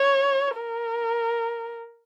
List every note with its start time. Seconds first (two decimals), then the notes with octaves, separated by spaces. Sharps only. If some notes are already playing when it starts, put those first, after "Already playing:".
Already playing: C#5
0.57 A#4